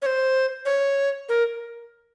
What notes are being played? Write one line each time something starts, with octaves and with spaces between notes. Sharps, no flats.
C#5
C5
C#5
A#4